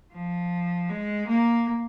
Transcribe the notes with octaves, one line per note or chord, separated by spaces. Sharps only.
F3
G#3
A#3